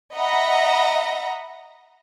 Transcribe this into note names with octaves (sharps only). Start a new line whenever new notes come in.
D#5 E5 F#5 A#5 B5 A#6